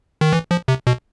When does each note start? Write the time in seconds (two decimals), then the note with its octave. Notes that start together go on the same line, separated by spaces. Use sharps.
0.21 D#3
0.33 E3
0.51 F3
0.68 C3
0.87 B2